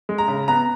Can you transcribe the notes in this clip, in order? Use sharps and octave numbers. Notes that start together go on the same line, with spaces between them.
G#3
A#5
C#3
B3 A#5